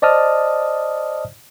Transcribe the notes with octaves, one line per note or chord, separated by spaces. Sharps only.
C5 D5 D#5 A5 D#6 F6